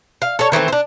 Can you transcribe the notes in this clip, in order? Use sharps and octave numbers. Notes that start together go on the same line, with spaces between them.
F5
A4 C#5
D#3 E3 A3 C4
D4 C5